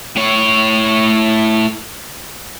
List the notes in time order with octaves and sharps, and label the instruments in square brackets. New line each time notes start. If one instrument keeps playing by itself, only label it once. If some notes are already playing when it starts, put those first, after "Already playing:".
[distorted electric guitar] A2 C#5